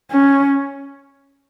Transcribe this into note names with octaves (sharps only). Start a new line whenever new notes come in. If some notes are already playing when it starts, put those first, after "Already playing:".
C#4